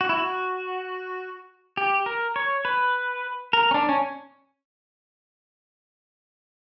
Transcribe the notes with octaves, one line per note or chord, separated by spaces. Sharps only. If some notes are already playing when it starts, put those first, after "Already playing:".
F#4
E4
F#4
G4
A#4
C#5
B4
A#4
C#4
D4
C#4